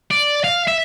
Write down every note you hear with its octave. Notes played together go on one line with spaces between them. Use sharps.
D5
F5
E5